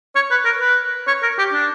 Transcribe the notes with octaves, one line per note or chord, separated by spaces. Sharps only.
C#5
B4
A#4
B4
C#5
A#4
G4
D4